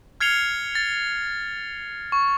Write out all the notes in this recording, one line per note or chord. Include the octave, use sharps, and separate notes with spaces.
F6 G#6 C7 C#7 F7 G7
A6
C#6